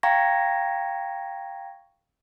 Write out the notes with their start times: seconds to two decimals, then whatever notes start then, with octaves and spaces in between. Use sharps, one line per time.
0.03 F5 G5 A#5 C#6 G#6 A#6